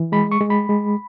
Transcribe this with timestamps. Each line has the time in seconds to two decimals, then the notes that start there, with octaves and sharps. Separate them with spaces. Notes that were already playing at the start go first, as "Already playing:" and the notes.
Already playing: E3
0.12 G#3 B5
0.32 C#6
0.41 G#3
0.50 B5
0.69 G#3